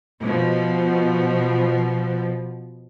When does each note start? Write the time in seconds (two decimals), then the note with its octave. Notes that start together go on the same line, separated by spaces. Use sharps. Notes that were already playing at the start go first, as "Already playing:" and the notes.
0.22 B2 F3